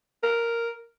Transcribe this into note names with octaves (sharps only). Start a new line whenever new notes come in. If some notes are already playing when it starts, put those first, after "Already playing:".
A#4